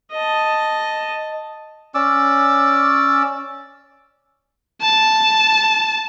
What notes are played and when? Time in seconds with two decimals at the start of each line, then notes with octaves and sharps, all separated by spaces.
0.12 D#5 A5
1.95 C#4 D5 D6 E6
4.81 A5